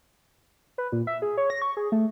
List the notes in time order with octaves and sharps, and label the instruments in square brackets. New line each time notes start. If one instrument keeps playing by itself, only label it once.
[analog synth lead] B4
A#2
E5
G#4
C#5
A#6
C#6
G#4
A3